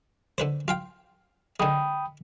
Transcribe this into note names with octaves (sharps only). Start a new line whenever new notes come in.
D3 B4 C5
F4 F5 G5
D3 G#3 G5 B5 D#6